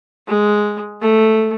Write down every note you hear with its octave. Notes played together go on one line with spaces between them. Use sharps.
G#3
A3